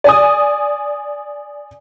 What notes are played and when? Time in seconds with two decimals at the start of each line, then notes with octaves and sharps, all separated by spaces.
0.04 D5 G#5 D#6